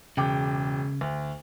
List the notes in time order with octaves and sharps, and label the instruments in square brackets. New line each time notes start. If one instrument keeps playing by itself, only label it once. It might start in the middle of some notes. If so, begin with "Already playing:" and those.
[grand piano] E1 G5 D6 [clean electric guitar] C#3
[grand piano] D2